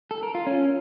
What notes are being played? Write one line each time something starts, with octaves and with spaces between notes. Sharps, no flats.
A4
A#4
F4
C#4